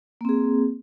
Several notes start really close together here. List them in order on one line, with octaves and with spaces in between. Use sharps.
A#3 C4 G#4